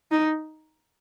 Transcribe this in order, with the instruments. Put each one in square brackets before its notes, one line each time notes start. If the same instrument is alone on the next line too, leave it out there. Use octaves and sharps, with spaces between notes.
[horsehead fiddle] D#4